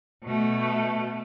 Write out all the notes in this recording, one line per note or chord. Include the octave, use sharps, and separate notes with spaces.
B2 A3